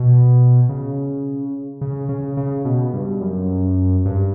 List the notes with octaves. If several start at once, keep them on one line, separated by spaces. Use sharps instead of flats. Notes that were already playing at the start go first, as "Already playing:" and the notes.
Already playing: B2
C#3
C#3
C#3
C#3
B2
G2
F#2
G2